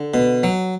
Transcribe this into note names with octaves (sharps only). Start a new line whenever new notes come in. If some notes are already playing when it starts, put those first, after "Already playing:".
Already playing: D3
B2
F#3